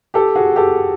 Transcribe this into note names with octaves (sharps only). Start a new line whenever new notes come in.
G4 A4
F#4 G#4
G4 A4